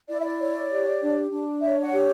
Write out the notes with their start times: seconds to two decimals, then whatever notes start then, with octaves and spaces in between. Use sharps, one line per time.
0.08 E4 D5
0.20 E5
0.24 D5
0.39 C#5
0.69 G4
1.01 D4
1.30 D4
1.61 C#5 E5
1.82 F#5
1.93 G4